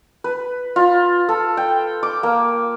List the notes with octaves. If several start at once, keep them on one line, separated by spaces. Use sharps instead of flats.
B4
F4
A4
G5
D6
A#3